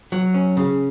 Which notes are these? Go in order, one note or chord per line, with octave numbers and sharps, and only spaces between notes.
F#3
C#4
C#3